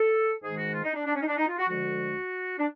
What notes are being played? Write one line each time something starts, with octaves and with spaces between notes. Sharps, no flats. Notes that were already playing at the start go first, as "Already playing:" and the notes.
Already playing: A4
G#2 D#3 G#3 G#4
F#4
F4
D#4
D4
D4
C#4
D#4
D4
D#4
F4
F#4
D2 D3 F3 G#3 F#4
D4